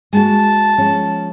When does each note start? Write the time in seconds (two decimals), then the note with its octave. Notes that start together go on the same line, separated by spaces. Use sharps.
0.13 G#3 A#3 F#4 A5
0.78 F3 G#3 C#4